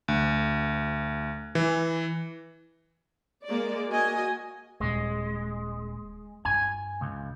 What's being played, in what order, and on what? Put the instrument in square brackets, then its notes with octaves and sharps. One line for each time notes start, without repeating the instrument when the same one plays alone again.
[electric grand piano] D2
E3
[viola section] G#3 A#3 D5
A#3 F#4 D#5 G#5
[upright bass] D#1 [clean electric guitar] G#3
[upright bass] G2 F4 [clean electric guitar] G#5
[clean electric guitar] C#2